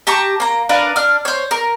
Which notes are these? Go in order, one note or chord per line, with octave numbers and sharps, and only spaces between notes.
G4 A5 A#5 C#6
A#3 A#5
D4 A#4 B4 F5
D4 F6
C5 C#5
A#4